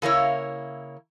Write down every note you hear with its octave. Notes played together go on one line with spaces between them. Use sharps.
C#3 A#3 E4 C#5